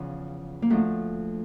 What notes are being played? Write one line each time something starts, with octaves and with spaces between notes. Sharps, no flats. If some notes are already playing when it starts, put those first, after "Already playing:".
Already playing: E2 C#3 F3
A#3
D2 D3 F3 A3